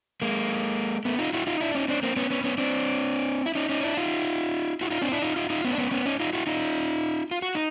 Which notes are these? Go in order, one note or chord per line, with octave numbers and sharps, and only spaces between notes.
G#3 A#3
A3 B3
D#4 F4
E4 F#4
D#4 F4
D4 E4
C#4 D#4
C4 D4
A#3 C4
B3 C#4
B3 C#4
B3 C#4
C4 D4
E4
C#4 D#4
C#4 D#4
D4 E4
D#4 F4
E4 F#4
D#4 F4
C4 D4
D4 E4
D#4 F4
D#4 F4
D#4 F4
B3 C#4
D4
B3 C#4
B3 C#4
C#4 D#4
D#4 F4
E4 F#4
D#4 F4
F4
F#4
D#4